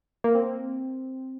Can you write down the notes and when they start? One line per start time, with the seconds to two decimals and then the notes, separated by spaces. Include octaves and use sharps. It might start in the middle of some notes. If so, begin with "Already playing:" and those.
0.24 A#3
0.35 C4